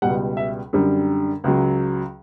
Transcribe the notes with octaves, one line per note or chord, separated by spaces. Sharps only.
C#2 B2 G3 F#5
E5
F#2 D3 G3
C#2 C#3 F#3